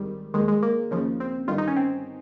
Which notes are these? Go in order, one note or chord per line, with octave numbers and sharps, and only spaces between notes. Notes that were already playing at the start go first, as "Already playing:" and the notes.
Already playing: G#1 G#2 D#3 G3
D#2 D#3 G#3
G#3
A#3
D#2 C#3 F3
C4
G1 G2 D#3 F4
D#4
C#4
C4